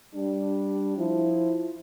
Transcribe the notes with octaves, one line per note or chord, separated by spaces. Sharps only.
G3 D4
F3 E4